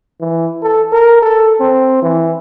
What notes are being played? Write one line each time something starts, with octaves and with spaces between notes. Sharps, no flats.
E3
A4
A#4
A4
C4
E3